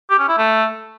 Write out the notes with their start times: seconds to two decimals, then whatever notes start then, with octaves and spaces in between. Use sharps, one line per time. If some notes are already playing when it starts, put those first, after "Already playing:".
0.10 G4
0.19 C#4
0.28 E4
0.38 A3